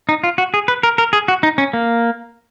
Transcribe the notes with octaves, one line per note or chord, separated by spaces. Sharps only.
D#4
F4
F#4
G#4
B4
A#4
A#4
G#4
F#4
D#4
C#4
A#3